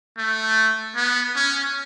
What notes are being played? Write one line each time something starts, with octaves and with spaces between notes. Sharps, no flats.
A3
B3
C#4